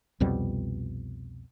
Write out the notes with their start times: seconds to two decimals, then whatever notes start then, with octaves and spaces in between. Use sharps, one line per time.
0.20 C2 F2 B2 G3